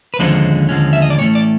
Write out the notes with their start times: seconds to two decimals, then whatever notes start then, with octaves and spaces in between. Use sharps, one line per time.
0.14 B4
0.19 D#2 D3 F3 G#3 C#4 C5
0.69 D#2 D3 F3 G#3 C#4
0.93 E5
1.02 D#5
1.10 D5
1.18 A2 E3 A3 C#4 C#5
1.35 D5